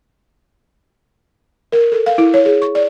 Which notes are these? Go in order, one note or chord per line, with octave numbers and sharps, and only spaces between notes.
A#4
A4
F5
E4
C#5
G#4
C#6
D5